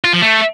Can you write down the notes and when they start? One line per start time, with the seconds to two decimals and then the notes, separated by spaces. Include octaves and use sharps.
0.04 F4
0.13 F3
0.22 A3